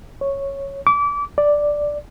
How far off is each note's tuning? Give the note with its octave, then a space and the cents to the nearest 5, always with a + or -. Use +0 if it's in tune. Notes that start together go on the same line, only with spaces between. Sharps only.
C#5 -5
D6 -25
D5 +0